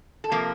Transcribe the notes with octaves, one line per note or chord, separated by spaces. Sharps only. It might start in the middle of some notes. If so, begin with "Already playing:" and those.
A4
C3 F3 A#3 A#4